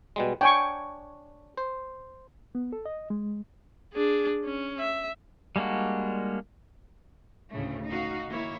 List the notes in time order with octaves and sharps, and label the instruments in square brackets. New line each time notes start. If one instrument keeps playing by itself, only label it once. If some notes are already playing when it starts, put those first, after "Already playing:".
[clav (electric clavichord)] B2 G3 G#3
[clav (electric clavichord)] D4 C#5 [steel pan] G5 G#5 C#6
[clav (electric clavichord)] C5
[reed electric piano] B3
A4
D#5
G#3
[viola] D4 G#4
C#4
E5
[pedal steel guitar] G3 G#3 A#3 D4 F#4
[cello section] D2 A2 C#3 A3
D#4 F#4 F5
D#3 A#3 E4 C#5